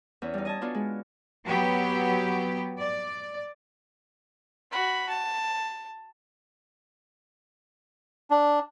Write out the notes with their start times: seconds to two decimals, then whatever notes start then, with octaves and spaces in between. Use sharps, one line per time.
0.22 E2 C#4
0.34 G3 D#4
0.45 D#5 G#5 A5
0.61 B3 D4 F4 F#4
0.75 G#3
1.46 F#3 B3 G4
2.78 D5
4.72 F#4 B5
5.09 A5
8.30 D4